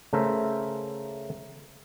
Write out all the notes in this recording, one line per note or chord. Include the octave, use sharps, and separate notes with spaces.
C#3 A3 A#4 C5 E5